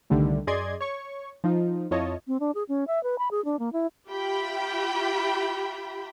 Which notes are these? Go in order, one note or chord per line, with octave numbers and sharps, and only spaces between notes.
C2 D3 D#3 G3 A3
F#2 G#4 D5 D#5 C6 G#6
C#5 C#6
F3 D#4 F4
F2 E4 F4 C#5 D#5 A5
C4
D4
G#4
C#4
E5
B4
B5
G#4
D4
A#3
E4
F4 G4 E5 G5 B5